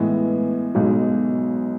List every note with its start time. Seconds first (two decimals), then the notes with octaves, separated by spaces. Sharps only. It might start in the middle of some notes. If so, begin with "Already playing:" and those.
Already playing: A2 E3 G#3 B3
0.75 B1 B2 G#3